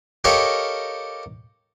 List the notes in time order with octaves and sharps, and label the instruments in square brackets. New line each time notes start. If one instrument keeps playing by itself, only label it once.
[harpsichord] G4 A4 A#4 C#5 D#5 F5